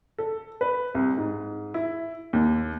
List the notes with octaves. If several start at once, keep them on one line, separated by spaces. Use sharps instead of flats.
A4
B4
C2
G#2
E4
D#2